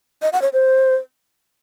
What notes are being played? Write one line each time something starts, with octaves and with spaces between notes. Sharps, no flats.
D#5
F#5
C#5
C5